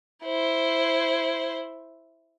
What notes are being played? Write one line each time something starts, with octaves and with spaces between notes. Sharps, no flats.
E4 C5